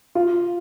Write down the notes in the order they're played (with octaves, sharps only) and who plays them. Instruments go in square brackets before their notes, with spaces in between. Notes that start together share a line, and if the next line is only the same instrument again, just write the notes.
[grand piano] F4